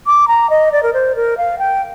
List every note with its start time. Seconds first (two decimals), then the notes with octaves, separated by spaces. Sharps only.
0.07 D6
0.28 A#5
0.50 D#5
0.72 D5
0.83 A#4
0.94 C5
1.16 A#4
1.37 F5
1.59 G5